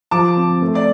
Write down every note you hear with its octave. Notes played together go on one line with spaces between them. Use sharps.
F3 A5 D6
C4
A3
D5